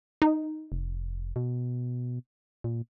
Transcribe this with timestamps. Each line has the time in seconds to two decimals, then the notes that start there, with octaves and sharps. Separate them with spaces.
0.22 D#4
0.72 F1
1.36 B2
2.64 A#2